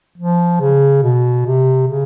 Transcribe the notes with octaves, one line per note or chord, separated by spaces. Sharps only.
F3
C#3
B2
C3
C#3